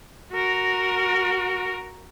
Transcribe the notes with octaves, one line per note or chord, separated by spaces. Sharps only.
F#4 A#4